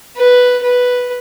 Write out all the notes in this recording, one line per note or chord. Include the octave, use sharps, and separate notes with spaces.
B4
B4